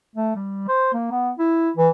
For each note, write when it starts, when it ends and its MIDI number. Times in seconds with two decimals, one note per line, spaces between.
0.16 0.33 57
0.35 0.65 55
0.68 0.90 72
0.93 1.09 58
1.11 1.30 59
1.39 1.70 64
1.77 1.89 52